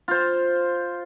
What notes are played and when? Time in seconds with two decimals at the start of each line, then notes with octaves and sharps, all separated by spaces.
0.08 F4 C5